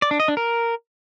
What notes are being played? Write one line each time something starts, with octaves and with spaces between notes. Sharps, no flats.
D5
D4
D#5
D4
A#4